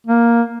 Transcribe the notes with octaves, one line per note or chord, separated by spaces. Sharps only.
A#3